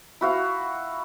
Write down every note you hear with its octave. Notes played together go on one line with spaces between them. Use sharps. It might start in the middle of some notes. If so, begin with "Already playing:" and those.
E4 F#4 F5